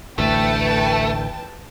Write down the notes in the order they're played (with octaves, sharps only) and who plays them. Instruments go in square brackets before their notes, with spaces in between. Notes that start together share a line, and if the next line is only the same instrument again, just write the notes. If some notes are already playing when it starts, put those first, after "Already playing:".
[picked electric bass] A1 D2 [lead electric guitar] A3 [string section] B4 G5 A5